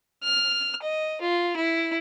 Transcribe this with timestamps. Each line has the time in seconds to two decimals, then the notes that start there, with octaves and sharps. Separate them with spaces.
0.23 F6
0.82 D#5
1.21 F4
1.57 E4